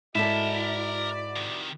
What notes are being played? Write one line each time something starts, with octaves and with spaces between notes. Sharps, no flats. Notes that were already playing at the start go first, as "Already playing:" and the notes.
G#2 E4 F#4 A4 A#4 D5 A5
C3 D#3